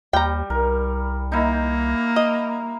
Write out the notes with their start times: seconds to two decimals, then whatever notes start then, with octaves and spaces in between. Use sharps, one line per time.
0.13 D#2 G3 G5 A#5
0.50 C2 A#4
1.32 A#3 D#4 E4
2.16 D#5